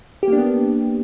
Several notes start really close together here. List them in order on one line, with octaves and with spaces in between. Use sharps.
G4 A#3 D4 B3